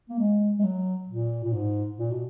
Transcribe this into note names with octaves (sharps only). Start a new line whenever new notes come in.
A#3
G#3
G#3
F#3
A#2
A#2
G#2
A#2
B2